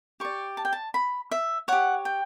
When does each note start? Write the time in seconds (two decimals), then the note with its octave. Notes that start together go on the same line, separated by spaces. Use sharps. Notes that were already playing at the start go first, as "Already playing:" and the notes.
0.20 G4 D5 C#6
0.57 A5
0.65 G5
0.73 A5
0.94 B5
1.31 E5
1.68 G4 C#5 F#5
2.05 G5